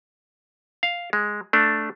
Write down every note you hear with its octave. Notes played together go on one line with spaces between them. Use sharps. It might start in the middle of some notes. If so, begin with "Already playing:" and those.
F5
G#3
A3 D4